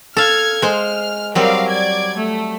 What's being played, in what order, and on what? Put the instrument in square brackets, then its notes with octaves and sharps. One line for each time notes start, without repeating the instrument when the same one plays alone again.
[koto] A4 F5 [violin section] F6 G#6
[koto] G#3 C5 [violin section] F6
[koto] F#3 G3 C4 [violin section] A#4 D5 F5
[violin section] D5 G#6
A3